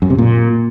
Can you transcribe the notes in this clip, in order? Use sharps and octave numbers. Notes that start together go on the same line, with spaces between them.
F#2
C3
A#2